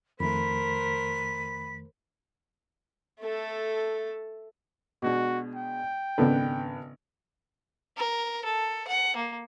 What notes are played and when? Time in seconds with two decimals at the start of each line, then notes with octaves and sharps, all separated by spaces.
0.20 F2 D#3 A3 A#4 C5 B5 B6
3.20 A3 A4
5.02 B2 G#3 D4 F#4
5.56 G5
6.18 G#1 C#3 B3 D4 A4 B4
7.97 A#4
8.45 A4
8.87 F#5
9.16 A#3